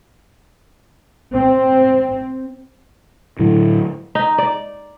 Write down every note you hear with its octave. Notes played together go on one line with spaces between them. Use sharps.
C4
A2 D3 F#3 E4
D#4
D5